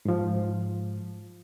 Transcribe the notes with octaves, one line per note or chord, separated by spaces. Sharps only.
G#2 F3